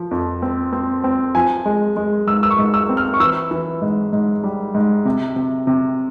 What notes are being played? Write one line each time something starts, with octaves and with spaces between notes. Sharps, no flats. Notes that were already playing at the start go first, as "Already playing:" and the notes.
Already playing: F3
F2
C4
C4
C4
F3 G#5
G#3
G#3
G#2 E6
E6
C#6
G#2
E6
C4
F6
C#6
E3 E6
E3
G#2
G#2
G3
G#2
C3
C3
C3